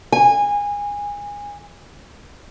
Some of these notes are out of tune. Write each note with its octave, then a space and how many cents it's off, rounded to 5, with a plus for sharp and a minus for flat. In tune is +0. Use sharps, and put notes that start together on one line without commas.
G#5 -20